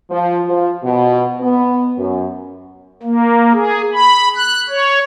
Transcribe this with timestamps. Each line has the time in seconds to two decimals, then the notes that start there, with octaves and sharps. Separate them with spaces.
0.10 F3
0.46 F3
0.83 B2
1.40 B3
1.98 F#2
3.03 A#3
3.53 G#4
3.93 B5
4.36 F#6
4.69 C#5